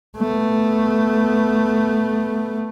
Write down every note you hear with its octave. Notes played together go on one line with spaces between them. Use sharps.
A3 B3